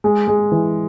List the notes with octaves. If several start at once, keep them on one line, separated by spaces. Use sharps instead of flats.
G#3
G#3
E3